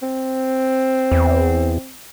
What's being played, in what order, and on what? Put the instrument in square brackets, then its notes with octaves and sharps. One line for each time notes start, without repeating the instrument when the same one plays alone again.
[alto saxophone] C4
[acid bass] E2